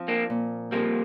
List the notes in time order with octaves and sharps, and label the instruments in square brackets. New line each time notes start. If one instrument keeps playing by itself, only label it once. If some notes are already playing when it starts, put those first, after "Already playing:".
Already playing: [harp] F3 C4 F4
[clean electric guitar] A#3 D4
[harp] A#2
[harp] F3 C4 F4 [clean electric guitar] G3 A#3